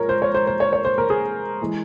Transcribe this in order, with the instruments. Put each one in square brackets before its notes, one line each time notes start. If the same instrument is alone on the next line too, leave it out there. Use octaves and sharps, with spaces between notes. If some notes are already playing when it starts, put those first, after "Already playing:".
Already playing: [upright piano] G#2 F3 G#3 A#4 C#5
C5
C#5
C5
C5
C#5
C#5
C5
A#4
G#4
E3 G#3